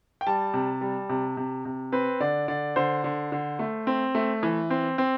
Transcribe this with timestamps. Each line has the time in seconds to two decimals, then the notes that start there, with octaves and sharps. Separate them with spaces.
0.21 G5
0.27 G3 A5
0.54 C3
0.81 G3
1.09 C3
1.37 C3
1.65 C3
1.92 C4 B4
2.20 D3 D5
2.48 D3 D5
2.76 D3 C5
3.04 D3
3.32 D3
3.59 A3
3.87 C4
4.15 A3
4.43 E3
4.70 C4
4.98 C4